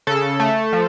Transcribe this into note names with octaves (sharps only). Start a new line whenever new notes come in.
C#3 A4
A3
F3